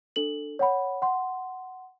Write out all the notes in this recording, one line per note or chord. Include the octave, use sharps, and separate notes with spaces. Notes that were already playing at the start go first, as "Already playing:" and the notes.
D4 A4 F#7
C#5 F#5 B5
F#5 C6